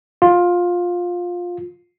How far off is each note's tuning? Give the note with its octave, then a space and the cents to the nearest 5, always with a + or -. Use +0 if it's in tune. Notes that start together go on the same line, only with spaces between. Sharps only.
F4 +15